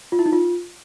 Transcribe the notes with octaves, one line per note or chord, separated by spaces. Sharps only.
F4
E4
D#4
F4